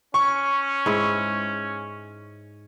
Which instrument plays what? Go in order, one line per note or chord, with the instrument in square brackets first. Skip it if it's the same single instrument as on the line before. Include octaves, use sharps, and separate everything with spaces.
[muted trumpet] C#4 [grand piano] C#6
[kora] G#2 E4